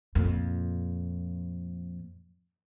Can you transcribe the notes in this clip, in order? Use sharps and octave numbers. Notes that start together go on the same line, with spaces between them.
F2 A#2